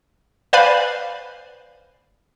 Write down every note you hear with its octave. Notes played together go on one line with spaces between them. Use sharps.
B4 C5 D5 F5 G#5 B5